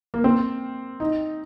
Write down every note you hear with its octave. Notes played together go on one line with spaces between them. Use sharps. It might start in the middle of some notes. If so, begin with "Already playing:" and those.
A#3
C4
D#4